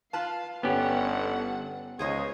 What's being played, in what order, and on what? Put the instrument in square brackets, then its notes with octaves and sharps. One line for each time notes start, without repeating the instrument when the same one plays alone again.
[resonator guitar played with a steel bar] F4 B4 A5 [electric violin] F5
[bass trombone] G1 [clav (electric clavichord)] B3 C#4 G4 [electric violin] A4 F#5
[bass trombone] C#2 [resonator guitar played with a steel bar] G#4 C5 D#5 [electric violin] C#5